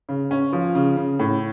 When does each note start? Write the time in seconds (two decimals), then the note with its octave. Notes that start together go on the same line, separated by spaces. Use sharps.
0.09 C#3
0.31 C#4
0.53 F3
0.75 C#3
0.97 C#3
1.19 A2